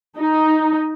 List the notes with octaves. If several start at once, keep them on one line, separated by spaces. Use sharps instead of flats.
D#4